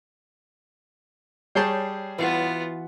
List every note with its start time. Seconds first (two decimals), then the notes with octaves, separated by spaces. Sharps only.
1.55 G3 G#4 C#5 A5 G6 C7
2.18 E3 B3 F4 F#4 F#5